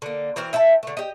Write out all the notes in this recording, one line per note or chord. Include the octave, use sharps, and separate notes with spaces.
D3 A#3
E3 C4 F#4 A#4
E4 E5 G5 A5
D3 A3
G4 D#5